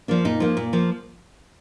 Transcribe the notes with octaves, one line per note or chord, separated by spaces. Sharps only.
F3 A#3 D4
A#2 D#4
F3 A#3
A#2
F3 A#3